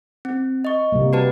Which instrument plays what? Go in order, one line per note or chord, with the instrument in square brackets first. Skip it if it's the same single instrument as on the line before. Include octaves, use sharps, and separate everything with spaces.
[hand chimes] C4
D#5 C#6
[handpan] C3 G3 A#3
[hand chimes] F#4 B4 A5